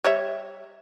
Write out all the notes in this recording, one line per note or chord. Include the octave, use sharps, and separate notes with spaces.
G3 C#5 E5